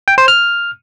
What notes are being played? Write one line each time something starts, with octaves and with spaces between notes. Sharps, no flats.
G5
C5
F6